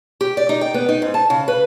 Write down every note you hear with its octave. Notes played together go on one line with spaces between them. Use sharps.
G4
D5
D#4
G5
B3
D#4
G#2
A5
C#3
B4